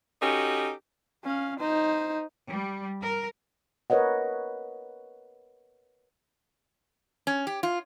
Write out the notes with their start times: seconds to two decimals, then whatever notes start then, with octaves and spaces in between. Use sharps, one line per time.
0.21 C#4 D#4 F#4 G4 A4
1.24 C#4 F5
1.60 D#4 C5
2.50 G3
3.01 A#4
3.90 A#4 B4 C#5 D#5 F#5
7.27 C#4
7.47 G4
7.63 F4